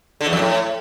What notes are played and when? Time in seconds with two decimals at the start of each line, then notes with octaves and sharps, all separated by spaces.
0.21 D3
0.27 E2
0.33 F2
0.39 A2